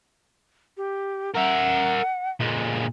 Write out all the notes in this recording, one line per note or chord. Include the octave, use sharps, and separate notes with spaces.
G4
A#4 E5 F#5
A#2 G#3